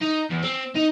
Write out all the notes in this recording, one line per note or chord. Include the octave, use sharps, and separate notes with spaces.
D#4
E2
C4
D#4